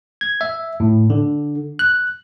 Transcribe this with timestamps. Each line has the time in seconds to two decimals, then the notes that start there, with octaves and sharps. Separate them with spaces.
0.21 G#6
0.41 E5
0.80 A2
1.10 D3
1.79 F#6